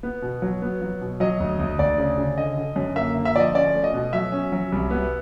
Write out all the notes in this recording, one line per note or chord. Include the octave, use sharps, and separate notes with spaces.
B3
B2
F#3
B3
F#3
B2
F#3 D#5
D2
D2
D2 D5
C#3
C#3
D3 D#5
D3
F#2
A#3 E5
D3
E5
F3 D5 D#5
C#4 D5
A3
D#5
B2
F#3 E5
C#4
F#3
C2
B3